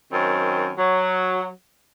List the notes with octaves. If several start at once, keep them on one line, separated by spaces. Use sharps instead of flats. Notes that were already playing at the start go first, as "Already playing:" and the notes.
F#2 D#3 C4
F#3